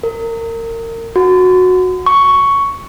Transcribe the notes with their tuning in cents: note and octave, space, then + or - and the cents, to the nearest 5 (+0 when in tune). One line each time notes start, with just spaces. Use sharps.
A#4 -30
F#4 -10
C#6 +5